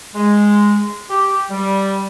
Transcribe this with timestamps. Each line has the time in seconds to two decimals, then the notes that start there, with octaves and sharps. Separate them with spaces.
0.15 G#3
1.10 G4
1.51 G3